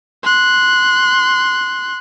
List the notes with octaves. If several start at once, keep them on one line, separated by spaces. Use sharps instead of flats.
C6 F#6